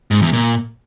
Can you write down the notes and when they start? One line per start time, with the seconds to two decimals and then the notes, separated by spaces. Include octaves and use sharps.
0.11 G#2
0.22 E2
0.33 A#2